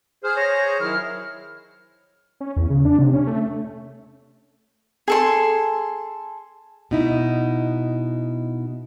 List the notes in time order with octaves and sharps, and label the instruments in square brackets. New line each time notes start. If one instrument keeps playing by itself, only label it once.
[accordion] G#4 C5 [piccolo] F6
[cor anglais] C#5 [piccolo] A#6
[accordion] D#3 F#3 E4 [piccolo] F6
[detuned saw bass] C#4
E2
C#3
D4
C3
C#4
A3
[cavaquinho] G#4 A4 C6
[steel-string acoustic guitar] B2 D#4 E4